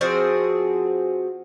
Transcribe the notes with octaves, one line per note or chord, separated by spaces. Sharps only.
F3 C4 F#4 G#4